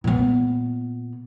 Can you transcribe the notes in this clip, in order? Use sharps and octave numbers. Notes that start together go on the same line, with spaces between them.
A#2 B3